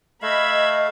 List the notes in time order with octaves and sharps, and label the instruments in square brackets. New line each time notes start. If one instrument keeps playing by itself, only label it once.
[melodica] A3 F5 [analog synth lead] D#5 [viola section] B5 [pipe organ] E6 G#6